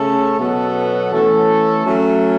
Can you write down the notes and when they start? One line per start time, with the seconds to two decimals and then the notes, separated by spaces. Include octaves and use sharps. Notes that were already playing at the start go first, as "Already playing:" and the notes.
Already playing: C#3 A3 C#4 A4
0.39 B2 F#3 B3 F#4 A4
1.12 E3 A3 C#4 A4
1.85 F#3 A3 C#4